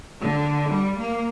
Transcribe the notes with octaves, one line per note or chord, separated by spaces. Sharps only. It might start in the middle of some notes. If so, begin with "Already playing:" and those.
D3
G3
A#3